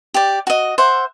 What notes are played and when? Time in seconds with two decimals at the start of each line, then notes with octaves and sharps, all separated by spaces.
0.14 G4 D5
0.47 F#4 D#5
0.78 C5 E5 F#5